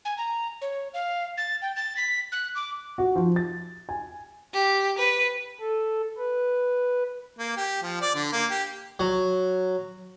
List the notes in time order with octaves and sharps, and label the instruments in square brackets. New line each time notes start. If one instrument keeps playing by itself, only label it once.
[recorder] G#5
A#5
C#5
F5
A6
G5
A6
B6
F#6
D6
[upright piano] F#4
F3
A6
G#5
[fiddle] G4
B4
[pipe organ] A4
B4
[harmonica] A#3
G4
F3
D5
D3
A#3
G4
[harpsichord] F#3